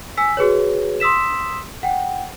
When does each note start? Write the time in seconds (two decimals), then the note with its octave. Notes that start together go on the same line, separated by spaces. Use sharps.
0.17 G#5 E6 B6
0.37 F#4 G#4 B4 C#5
1.00 C6 D#6 E6 B6 E7
1.83 F#5 G5